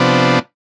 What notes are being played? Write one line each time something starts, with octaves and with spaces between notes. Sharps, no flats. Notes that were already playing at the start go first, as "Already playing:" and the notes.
Already playing: C3 F3 B3 D4